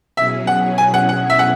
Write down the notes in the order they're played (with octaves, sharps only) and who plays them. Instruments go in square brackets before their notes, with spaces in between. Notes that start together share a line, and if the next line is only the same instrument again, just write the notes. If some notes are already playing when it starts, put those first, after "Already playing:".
[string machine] B2 F#3 C#4 E4 G#4 [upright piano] E5
[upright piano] F#5
G#5
F#5
F#5
E5
F#5